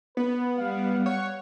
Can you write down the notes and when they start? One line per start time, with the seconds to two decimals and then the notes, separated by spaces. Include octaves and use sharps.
0.17 B3 B4
0.57 G3 F5
1.06 C#5 F#5